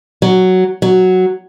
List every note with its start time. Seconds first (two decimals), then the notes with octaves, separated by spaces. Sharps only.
0.22 F#3
0.82 F#3